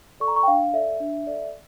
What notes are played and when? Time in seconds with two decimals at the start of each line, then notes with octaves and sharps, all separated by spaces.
0.20 A4 D5 C#6
0.28 A#5
0.36 C#6
0.43 G5
0.48 D4 F5
0.73 A4 D5 E5
1.00 D4
1.27 A4 D5